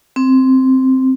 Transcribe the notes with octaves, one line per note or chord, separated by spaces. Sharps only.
C4